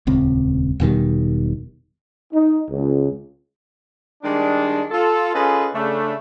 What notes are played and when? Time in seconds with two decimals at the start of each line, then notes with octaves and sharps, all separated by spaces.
0.07 D#1 C#2 C4
0.80 E1 B2 D#3 G3
2.33 D#4
2.70 C#2
4.24 D#3 G3 G#3 D4
4.91 F4 A4
5.35 C#4 F4 G#4 A4 B4 D#5
5.75 C#3 A3 D4